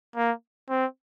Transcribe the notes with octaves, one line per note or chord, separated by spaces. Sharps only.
A#3
C4